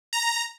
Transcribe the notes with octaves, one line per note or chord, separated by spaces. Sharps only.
A#5